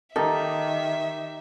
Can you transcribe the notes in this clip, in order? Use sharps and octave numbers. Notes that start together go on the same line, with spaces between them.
D#3 A#3 D#4 G4 A4 E5